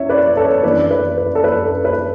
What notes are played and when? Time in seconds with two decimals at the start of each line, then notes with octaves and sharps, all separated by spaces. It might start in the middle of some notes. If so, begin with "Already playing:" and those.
Already playing: E2 C#4 C#5 E5
0.09 B4 D5
0.37 A4 C#5
0.63 F#2 E3 A3 D4 B4 D5
0.91 B4
1.18 B4
1.35 A4
1.44 B4
1.65 A4
1.85 B4